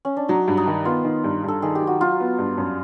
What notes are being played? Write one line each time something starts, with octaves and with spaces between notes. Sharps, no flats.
C#4
D4
F#3 D#4
G2
D#4
D#3
B3 F4
D#3
G2
G2 A4
D#3 G#4
G4
F#3
F#4
F#3 F4
B3
G2
F#2